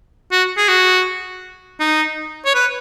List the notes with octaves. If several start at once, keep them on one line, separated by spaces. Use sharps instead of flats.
F#4
G#4
F#4
D#4
C#5
B4